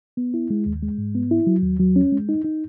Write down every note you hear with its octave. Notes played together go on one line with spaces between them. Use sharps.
B3
E4
G#3
D#2
G#3
G#2
B3
E4
F#3
D#2
F#3
C#4
G#3
D#4
D#4